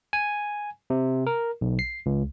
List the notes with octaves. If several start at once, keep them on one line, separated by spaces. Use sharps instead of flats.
G#5
C3
A#4
B1
C7
C#2